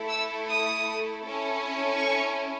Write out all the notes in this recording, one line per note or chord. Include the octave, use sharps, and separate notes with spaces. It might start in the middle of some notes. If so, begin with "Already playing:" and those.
Already playing: A3 E4 A4
E6
D#6
C#4 E4 A4
C#6